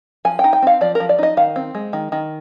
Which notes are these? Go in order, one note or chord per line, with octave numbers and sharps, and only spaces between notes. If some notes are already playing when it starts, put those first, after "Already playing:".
F3 G#5
G5
D#4
G5
C4 F5
F3 D5
A#4
F3
D5
D#4 D#5
D#3 F5
C4
G#3
D#3
D#3